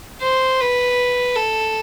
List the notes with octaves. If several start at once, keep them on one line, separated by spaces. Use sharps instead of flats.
C5
B4
A4